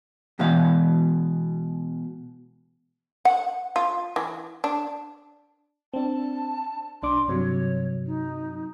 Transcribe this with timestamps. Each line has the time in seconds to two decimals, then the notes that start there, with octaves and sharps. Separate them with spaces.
0.39 B2 E3 G#3 F5
3.25 F#5
3.76 F4
4.16 E3
4.64 D4
5.93 C4 D4 A5
7.03 B1 D4 C6 D6
7.28 G2 C3 F#3 C#5
8.07 D#4